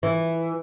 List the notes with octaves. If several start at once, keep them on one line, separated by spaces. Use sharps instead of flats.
E3